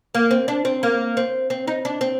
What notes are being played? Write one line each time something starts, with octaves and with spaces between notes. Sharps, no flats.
A#3
C4
D4
C4
A#3
C4
C4
D#4
D4
C4